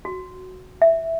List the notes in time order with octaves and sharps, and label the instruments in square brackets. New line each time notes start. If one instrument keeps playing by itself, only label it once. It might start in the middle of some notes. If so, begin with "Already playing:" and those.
[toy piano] F#4
E5